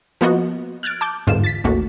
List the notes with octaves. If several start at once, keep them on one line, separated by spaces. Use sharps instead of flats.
F3 A#3 B3 F4 F#4 D#5
F6 F#6 G#6 A6 D7
A5 D6 G6
G1 E2 G#2 D3 F4 E7
A6 B6
A1 D#2 A3 A#3 F#4